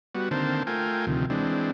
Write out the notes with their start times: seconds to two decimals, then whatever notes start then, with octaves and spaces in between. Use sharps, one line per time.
0.15 G3 B3 F#4
0.31 D3 D#3 A#3 C4 C5 A5
0.67 A3 F4 A#4 G5 G#5
1.07 D2 C3 D#3 F3
1.30 E3 G#3 C4 D4